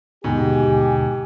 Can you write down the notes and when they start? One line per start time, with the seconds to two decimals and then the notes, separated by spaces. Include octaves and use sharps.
0.24 D#2 G#2 B2 D3 G4 G#5